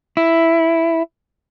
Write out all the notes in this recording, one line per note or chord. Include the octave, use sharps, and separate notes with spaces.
E4